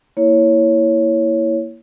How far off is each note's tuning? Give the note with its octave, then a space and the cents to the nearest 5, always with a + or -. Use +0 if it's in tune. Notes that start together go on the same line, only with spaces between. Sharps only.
A#3 +5 E4 +0 C#5 +0